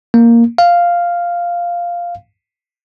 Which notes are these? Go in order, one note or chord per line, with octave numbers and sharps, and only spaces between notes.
A#3
F5